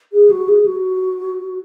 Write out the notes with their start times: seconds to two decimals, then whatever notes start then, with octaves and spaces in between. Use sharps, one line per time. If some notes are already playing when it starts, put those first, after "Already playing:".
0.13 G#4
0.31 F#4
0.48 G#4
0.66 F#4